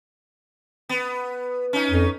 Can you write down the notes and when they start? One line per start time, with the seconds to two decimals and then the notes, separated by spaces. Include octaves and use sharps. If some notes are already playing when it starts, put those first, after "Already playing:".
0.89 B3
1.73 C#4 D#4
1.90 F2